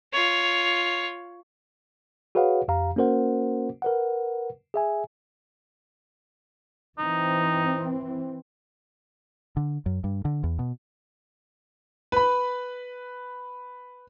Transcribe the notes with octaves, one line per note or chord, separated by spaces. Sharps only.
F4 C#5
F#4 G#4 B4 C#5 F5 F#5
F2 G4 F5 A#5
A#3 C#4 F#4 A#4 C5 F#5
A#4 B4 F#5
G#4 E5 G#5
E3 C4 D#4
D3
F#2
G2
D3
E2
B2
B4 B5